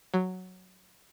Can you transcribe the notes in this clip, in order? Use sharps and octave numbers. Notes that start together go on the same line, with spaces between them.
F#3